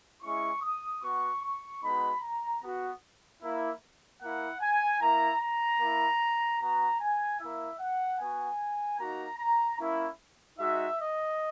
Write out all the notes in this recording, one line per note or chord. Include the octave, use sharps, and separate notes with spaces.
G#3 C#4 E4 C#6
D#6
B3 F#4 C#6
C#6
G#3 B3 D#4 F#4 B5
A#5
B3 F#4
A#3 E4
A#3 E4 F#5
G#5
A#3 E4 A#5
A#5
A#3 E4
B3 F#4 A#5
G#5
A#3 E4 E5
F#5
B3 F#4 G#5
A#3 D#4 F#4 A#5
A#5
A#3 C#4 E4
G#3 D#4 F#4 E5
D#5